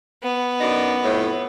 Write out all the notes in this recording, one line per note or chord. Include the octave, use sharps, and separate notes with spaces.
B3
F#2 D4 D#4
F2 A2